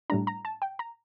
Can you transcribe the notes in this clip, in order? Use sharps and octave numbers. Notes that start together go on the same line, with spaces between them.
A2 G3 D4 A#5
A#5
A5
G5
A#5